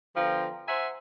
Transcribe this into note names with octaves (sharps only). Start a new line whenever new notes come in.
D3 F3 B3 F4 G5 A#5
C5 E5 F#5 G#5 A#5 C6